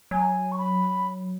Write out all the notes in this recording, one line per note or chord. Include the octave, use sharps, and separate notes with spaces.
F#3 G#5
C#6
B5